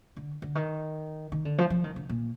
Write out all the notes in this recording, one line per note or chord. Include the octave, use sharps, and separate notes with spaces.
D3
D3
D#3
D#3
D3
F3
F3
D#3
D3
A#2